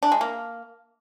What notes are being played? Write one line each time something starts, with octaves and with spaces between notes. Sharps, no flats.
D4
G#3
A#3